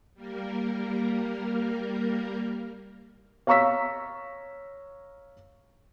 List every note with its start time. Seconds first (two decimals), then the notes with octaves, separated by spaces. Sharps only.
0.15 G3 A#3 A#4
3.47 C#5 F5 A#5 C#6 E6 B6